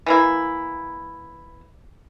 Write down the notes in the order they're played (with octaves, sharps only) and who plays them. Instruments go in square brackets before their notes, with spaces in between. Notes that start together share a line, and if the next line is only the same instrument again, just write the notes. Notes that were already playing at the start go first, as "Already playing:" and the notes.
[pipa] E3 A#3 E4